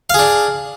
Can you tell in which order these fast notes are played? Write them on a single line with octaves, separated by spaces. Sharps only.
F5 G#4 D4